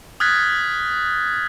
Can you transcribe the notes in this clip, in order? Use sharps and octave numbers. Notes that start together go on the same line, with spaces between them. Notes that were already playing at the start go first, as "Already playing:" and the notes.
D#6 F6 F#6 G#6 A6 B6